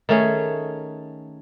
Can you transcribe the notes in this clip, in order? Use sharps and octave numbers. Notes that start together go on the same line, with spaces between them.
D#3 A3 C#4 G#4